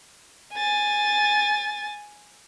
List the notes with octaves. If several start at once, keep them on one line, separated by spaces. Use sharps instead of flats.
G#5 A6